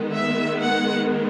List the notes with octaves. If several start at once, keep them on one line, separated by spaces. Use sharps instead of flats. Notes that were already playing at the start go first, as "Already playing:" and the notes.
Already playing: D#3 G#3 B3
E5
F#5